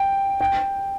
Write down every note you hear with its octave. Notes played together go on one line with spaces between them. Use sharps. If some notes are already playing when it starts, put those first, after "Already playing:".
Already playing: G5
G5